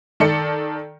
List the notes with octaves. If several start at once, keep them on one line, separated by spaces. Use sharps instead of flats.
D#3 A4 D5 C#7